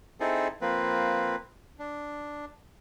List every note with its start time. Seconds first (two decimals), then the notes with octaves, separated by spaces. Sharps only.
0.20 C4 D#4 E4 G#4 A4
0.61 F3 A#3 C4 B4
1.79 D4